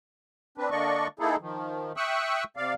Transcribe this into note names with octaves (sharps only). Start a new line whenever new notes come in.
C4 D4 B4
D3 A#3 D4 D5 D#5 C#6
A#3 D#4 E4 G#4 A4
D#3 F3
E5 G5 C#6 D#6 E6 F#6
C3 D5 F5